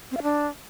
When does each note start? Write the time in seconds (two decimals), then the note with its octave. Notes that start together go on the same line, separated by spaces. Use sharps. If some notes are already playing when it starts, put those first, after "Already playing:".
0.11 C4
0.17 F5
0.23 D4